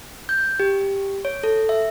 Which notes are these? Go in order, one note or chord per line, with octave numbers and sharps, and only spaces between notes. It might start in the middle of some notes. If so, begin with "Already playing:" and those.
G6
G4
C#5
A4
E5